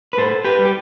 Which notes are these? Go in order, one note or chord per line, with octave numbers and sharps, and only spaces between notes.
B4
A2 A4 C5
G4 B4
G3
G4